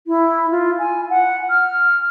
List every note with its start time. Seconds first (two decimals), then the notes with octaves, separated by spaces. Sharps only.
0.07 E4
0.51 F4
0.79 G#5
1.10 F#5
1.50 F6